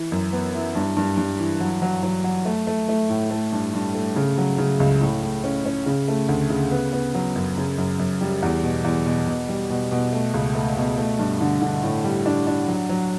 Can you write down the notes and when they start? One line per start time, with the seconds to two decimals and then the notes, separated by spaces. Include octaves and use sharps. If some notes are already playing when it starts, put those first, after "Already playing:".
Already playing: E3
0.12 F#2
0.33 B3
0.54 E4
0.75 G2
0.97 G2
1.18 G2
1.39 E3
1.60 F#3
1.82 F#3
2.03 F#3
2.24 F#3
2.45 A3
2.67 A3
2.89 A3
3.10 A2
3.31 A3
3.53 G2
3.73 G2
3.95 A3
4.16 C#3
4.38 F#3
4.58 C#3
4.80 C#2
5.01 A2
5.23 A2
5.44 C#4
5.65 C#4
5.86 C#3
6.08 A3
6.29 D2
6.50 C#3
6.71 B3
6.93 B3
7.14 F#3
7.36 F#2
7.57 C#3
7.78 F#2
7.99 F#2
8.21 G3
8.42 E2
8.63 B2
8.84 E2
9.06 B2
9.27 B2
9.48 G3
9.70 B2
9.91 B2
10.13 A3
10.34 C#2
10.55 A3
10.76 B2
10.98 A3
11.19 G2
11.41 D3
11.62 D3
11.83 A2
12.04 G3
12.26 D4
12.47 D4
12.68 F#3
12.89 F#3